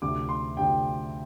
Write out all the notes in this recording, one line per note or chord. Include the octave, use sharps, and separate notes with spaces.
D2 C3 F3 D6
C6
D2 C3 F3 G5